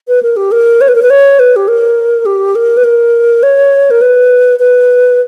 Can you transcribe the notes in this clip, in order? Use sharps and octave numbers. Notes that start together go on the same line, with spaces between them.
B4
A#4
G4
A#4
C#5
B4
A#4
B4
C#5
B4
G4
A#4
G4
A#4
B4
A#4
C#5
A#4
B4
B4